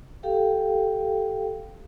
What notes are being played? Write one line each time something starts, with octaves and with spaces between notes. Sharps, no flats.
G4 A4 F5 G5